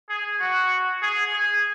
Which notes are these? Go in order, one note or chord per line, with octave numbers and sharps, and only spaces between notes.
G#4
F#4
G#4
G#4